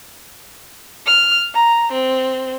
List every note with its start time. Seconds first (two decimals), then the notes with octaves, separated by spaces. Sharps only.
1.06 F6
1.54 A#5
1.92 C4